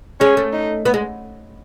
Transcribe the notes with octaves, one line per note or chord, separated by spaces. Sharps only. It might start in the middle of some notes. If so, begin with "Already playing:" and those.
G#3 C#4
A3
D#4
B3
G#3